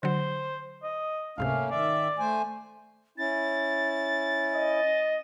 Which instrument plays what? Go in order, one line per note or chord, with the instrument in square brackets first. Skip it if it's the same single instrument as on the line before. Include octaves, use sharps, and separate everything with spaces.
[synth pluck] D3 F#3 [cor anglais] C5
[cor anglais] D#5
[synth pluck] C#2 G#2 C3 [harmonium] A3 A#3 C#4 [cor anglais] F5
[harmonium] D#3 E5 [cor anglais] D5
[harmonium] A3 C5 G#5
[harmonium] C#4 E4 [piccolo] A6
[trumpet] D#5